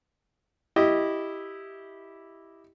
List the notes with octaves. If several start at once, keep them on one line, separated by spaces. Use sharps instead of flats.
E4 G4 D#5